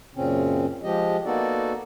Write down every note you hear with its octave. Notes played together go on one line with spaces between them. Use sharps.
F#2 A#2 C#3 C4 C#4
F3 G#3 G4 D#5
A#3 B3 D#4 F#4 A4 D5